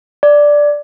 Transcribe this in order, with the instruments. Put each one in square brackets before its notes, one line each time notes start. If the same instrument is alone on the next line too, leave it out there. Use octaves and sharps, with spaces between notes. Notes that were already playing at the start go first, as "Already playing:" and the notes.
[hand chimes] D5